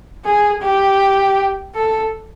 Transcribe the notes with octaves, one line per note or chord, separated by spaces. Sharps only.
G#4
G4
A4